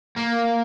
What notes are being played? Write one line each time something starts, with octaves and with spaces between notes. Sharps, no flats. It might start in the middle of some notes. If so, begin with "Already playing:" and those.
A#3